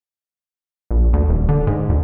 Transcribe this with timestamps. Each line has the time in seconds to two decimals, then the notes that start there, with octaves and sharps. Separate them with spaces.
0.91 A#1
1.13 D2
1.29 D#1
1.49 D3
1.67 G#2
1.90 D2